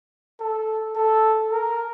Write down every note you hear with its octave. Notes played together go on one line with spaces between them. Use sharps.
A4
A4
A#4